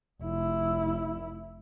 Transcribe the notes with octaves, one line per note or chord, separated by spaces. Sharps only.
F1 E4